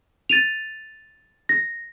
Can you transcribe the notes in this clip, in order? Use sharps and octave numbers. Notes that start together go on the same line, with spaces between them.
A6 D#7 F7
A#6